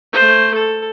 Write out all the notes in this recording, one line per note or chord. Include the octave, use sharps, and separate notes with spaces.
A3 C5
A4